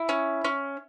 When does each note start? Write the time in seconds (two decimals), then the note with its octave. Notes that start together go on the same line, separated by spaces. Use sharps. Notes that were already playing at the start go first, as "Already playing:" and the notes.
Already playing: E4
0.09 C#4
0.45 C#4